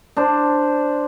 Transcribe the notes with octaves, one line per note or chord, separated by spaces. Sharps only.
D4 C5